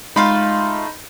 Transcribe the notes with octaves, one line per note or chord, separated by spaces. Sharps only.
G#3 A3 D#4 F4 F5 B5 C6